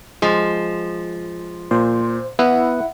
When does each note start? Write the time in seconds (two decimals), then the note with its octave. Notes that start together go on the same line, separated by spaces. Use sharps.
0.22 F3 G#3
1.71 A#2 C5
2.39 B3 E4 F#5